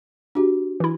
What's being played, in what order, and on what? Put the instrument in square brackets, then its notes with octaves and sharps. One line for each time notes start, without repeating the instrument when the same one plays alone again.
[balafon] D4 F#4 G4
[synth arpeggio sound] E3 E4